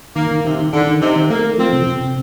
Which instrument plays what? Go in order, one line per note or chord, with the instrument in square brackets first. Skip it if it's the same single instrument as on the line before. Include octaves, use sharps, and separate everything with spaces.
[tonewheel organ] D#3 [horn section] A#3
[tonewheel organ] D#3
[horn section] C3 [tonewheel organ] D#3
[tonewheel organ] D#3
[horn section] D3 [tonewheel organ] D#3
[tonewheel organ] D#3
[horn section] C3 [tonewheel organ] D#4
[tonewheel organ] D#3
[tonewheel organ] A3 [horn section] A#3
[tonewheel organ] A3
[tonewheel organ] F3 [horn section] C4
[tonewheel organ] C3
C3
C3